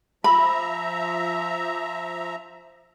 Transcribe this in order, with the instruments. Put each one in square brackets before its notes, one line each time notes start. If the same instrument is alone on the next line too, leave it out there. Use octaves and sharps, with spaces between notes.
[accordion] F3 E5 A#5 [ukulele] B5